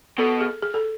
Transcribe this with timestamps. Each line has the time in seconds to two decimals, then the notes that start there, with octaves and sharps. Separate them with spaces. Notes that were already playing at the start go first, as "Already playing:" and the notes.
0.18 B2 A4
0.41 G#4
0.63 G#4
0.74 A4